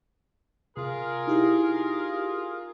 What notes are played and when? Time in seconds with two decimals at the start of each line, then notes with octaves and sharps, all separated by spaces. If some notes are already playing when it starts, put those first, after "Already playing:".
0.77 C3 F4 G#4 A#4
1.27 D#4 E4 G4